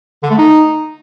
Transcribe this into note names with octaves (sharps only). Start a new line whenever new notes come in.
D3
A3
D#4